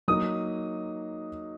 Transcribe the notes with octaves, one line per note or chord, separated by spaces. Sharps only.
F#3 A#3 D#4 D#6